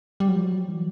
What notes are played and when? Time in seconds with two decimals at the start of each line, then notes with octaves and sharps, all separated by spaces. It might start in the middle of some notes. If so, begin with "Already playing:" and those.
0.20 G3
0.28 F#3
0.36 F3
0.44 F#3
0.68 E3